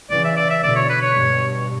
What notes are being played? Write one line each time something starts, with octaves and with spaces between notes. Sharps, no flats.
C#3 E3 D5
E5
D5
E5
B2 D3 D5
C#5
B4
C#5
G2 B2